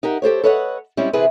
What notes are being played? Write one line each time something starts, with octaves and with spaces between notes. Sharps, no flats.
D#4 G4 A#4 F#5
G4 A4 C5 C#5
A4 B4 C#5 D#5 F5 F#5
G3 G#3 C4 C#4 E4
C3 E3 C4 E4 G#4 B4